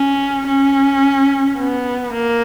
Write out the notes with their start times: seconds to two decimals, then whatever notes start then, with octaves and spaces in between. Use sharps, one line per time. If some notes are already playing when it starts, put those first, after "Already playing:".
Already playing: C#4
0.46 C#4
1.58 B3
2.13 A#3